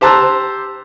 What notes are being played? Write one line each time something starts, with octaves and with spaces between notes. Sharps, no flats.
G4 C5 A5 A#5 E6 F#6